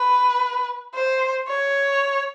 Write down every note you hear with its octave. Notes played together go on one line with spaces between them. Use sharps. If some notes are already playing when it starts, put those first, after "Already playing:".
Already playing: B4
C5
C#5